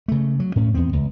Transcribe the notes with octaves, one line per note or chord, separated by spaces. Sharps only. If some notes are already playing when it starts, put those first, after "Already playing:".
C#3 A3
F#3
A2 C#4
E2 B3 C4
C#2